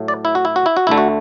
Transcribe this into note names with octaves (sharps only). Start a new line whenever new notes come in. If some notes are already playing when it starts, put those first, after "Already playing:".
Already playing: A2 F#3 A3
D5
E4
F#4
E4
F#4
E4
F#4
D2 D3 A3 E4
F#4